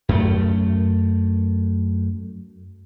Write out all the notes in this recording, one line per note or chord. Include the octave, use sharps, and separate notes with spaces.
F#2 A3